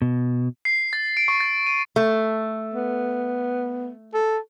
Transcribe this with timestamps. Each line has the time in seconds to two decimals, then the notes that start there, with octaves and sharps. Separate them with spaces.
0.02 B2
0.65 C7
0.93 A6
1.17 D7
1.28 C#6
1.41 A6
1.67 D#7
1.96 A3
2.74 B3
4.14 A4